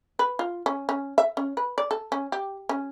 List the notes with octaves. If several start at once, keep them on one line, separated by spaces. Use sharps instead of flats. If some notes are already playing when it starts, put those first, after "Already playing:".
B4
F4
C#4
C#4
E5
C#4
B4
D5
A4
C#4
G4
C#4